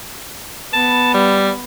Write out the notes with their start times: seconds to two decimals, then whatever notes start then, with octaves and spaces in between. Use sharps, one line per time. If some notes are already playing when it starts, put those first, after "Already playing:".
0.73 B3 A5 B5
1.14 G3